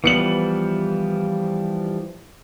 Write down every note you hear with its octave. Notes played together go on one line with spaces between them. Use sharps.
E3 F3 G3 B3 C#7 F#7